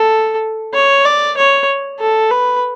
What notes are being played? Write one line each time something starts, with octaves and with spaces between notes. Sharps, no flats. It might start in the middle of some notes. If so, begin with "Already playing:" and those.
Already playing: A4
C#5
D5
C#5
A4
B4